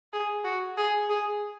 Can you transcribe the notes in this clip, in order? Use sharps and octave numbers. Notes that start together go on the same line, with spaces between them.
G#4
F#4
G#4
G#4